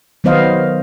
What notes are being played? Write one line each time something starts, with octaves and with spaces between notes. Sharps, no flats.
D#3 F#3 B3 C5 D#5 F5